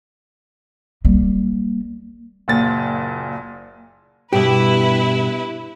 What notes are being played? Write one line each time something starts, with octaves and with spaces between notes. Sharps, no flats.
G3 A#3
F#1 A#2 A6
G2 B2 E4 G4 B4 E5